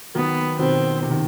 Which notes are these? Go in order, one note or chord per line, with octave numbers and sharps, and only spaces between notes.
D#3 F#3 B3
B2 D#3 C4
C3
D#3